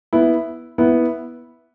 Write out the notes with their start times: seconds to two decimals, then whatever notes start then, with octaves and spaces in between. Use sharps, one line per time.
0.13 B3 E4
0.78 B3 E4